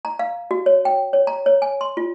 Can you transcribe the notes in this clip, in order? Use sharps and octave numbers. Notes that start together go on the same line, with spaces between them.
A#5
F5
F#4
C#5
G5
C#5
A#5
C#5
G#5
C6
F4